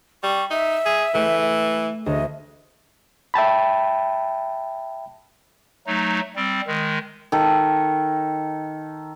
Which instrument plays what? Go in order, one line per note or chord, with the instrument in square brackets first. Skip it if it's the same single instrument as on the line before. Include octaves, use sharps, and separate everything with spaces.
[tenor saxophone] G3 [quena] C#6
[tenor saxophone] D#4 [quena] E5
[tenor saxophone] G#4
[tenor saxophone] E3 [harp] A3
[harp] D2 [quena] D#5
[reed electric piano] E5 G5 A5 B5
[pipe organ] F#3 A3 D#4
G3 C4
D#3 G#3
[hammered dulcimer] D#3 A4